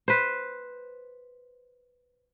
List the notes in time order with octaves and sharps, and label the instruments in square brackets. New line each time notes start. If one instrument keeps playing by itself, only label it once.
[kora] B4 C5